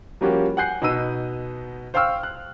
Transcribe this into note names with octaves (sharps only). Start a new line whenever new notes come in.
F3 G3 A#3 C#4 F#4 G4
F#5 G#5 F#6 G6 C7
B2 B3 D#4 E6 D#7
C5 F5 G5 C#6 E6 F6
F#6